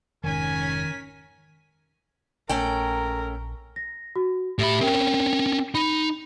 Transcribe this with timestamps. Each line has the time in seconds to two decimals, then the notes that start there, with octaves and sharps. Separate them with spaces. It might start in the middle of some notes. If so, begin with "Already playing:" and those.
0.24 F1 G#2 D#3 C#4 A#4 G#5 B6
2.49 A#1 A3 C#4 A#4 G5
3.76 A#6
4.16 F#4
4.59 A2 G4 E5 B5
4.81 C4 C#4 A#4 G5
5.75 D#4 B5